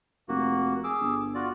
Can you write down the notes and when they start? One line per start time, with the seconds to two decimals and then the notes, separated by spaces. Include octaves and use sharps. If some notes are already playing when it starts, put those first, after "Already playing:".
0.29 F1 A#3 F#4
0.84 G#4 D6 E6
1.00 G1
1.35 F4 F#4 D5